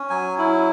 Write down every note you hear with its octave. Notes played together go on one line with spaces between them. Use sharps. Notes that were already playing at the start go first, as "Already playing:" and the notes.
Already playing: C#4
F#3 G#5
E4